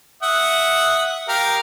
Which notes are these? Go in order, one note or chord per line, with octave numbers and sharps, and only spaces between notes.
E5 F#5 D#6
G4 A#4 F5